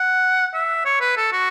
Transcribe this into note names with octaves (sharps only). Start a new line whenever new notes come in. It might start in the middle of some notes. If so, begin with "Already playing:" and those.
Already playing: F#5
E5
C#5
B4
A4
F#4